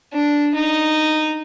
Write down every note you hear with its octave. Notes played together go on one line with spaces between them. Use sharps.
D4
D#4